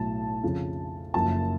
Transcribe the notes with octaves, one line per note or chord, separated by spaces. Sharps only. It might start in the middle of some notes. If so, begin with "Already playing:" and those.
Already playing: B1 A2 F#3 A5
F2 C#3 F3
F#1 F#2 F3 A5